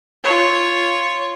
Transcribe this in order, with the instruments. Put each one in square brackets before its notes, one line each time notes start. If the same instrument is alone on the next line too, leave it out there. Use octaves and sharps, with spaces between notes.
[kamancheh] F4 C#5